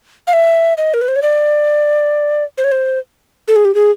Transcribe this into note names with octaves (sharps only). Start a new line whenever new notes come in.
F5
E5
D#5
A#4
B4
C5
C#5
D5
C5
C#5
C5
A4
G#4
G4
G#4